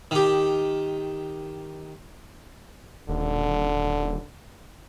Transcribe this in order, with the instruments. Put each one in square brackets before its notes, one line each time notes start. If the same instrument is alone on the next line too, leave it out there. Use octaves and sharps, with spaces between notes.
[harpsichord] D#3 G4
[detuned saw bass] D#1 [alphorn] D3